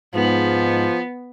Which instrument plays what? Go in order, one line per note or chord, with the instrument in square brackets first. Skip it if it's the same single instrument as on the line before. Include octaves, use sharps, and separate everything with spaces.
[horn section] G#2 [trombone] F3 [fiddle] B3